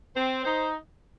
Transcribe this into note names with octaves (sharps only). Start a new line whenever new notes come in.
C4 C5
D#4 C5